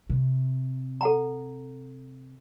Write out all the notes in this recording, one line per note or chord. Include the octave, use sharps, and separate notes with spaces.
C3
A4 F#5 A#5